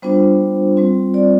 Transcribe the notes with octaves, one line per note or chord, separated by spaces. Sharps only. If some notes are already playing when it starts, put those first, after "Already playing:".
G3 B3 D4 F4 C5
G3 C4 F4
D5